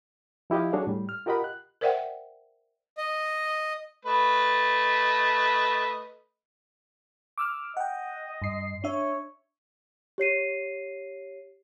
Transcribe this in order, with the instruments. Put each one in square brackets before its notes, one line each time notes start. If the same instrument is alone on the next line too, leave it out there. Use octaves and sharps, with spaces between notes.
[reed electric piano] F3 E4 G4 D#5 F5
F#3 D4 F#4 G#4 A4 C#5
A2 G3
F6
F4 G4 A#4 D#5 F#5 B5
F#6
[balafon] A#4 C5 D5 E5 F#5 G5
[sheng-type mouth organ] D#5
[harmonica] A3 B4 D#5
[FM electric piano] D6 E6 F6
[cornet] D#5 [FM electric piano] F#5 G5
[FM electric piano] G2 C7
[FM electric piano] D4 E5 [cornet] C#5
[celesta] G4 C#5 C7 D#7